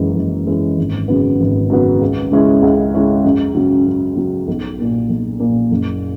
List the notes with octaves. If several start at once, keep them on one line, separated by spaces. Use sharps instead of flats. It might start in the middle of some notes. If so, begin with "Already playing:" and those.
Already playing: F#1 F#2 E3 G#3 C#4
F#1
F#2 E3 G#3 C#4
G#1
F#2 C#3 F#3 B3
G#1
F#2 C#3 F#3 B3
C#2
C#3 G#3 C#4 E4
C#2
C#3 G#3 C#4 E4
F#2
C#3 F#3
F#2
C#3 F#3
B1
A#2 A#3
B1
A#2 A#3
F#1